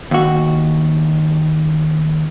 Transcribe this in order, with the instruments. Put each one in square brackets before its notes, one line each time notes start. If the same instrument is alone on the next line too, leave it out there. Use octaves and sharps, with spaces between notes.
[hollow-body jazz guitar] D#2 F#4